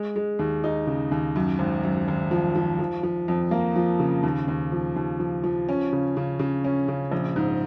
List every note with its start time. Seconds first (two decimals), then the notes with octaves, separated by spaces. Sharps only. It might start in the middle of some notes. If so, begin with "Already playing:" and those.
Already playing: G#3
0.16 G#3
0.39 D#2
0.64 D#4
0.87 C#3
1.11 D#2
1.36 F#2
1.59 G#1
1.83 F#2
2.08 G#1
2.31 F3
2.55 F3
2.79 F3
3.03 F3
3.28 F2
3.51 A#3
3.76 F3
4.00 C#3
4.23 D#2
4.48 D#2
4.72 F3
4.96 D#2
5.20 F3
5.44 F3
5.69 C#4
5.93 C#3
6.17 C#3
6.39 C#3
6.64 C#4
6.88 C#3
7.11 A#1
7.36 G#2